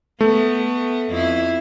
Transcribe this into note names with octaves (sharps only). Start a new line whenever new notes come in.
A3 B3
F2 E4